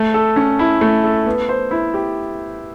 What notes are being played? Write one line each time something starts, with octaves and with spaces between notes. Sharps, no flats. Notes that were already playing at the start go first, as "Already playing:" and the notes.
Already playing: A3
A4
C#4
E4
A3
A4
B3
C5
E4
G4